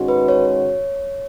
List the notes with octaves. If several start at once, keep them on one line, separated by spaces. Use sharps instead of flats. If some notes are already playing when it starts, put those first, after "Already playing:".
Already playing: G#2 D#3 G#3 C#4 F#4
B4
C#5